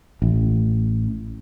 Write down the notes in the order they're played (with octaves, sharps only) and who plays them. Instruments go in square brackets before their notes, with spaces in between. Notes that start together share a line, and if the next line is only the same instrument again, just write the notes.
[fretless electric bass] A1